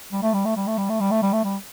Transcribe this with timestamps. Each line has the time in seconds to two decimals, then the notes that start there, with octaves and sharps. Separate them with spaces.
0.12 G3
0.23 A3
0.34 G3
0.45 A3
0.56 G3
0.67 A3
0.78 G3
0.89 A3
1.00 G3
1.11 A3
1.22 G3
1.33 A3
1.44 G3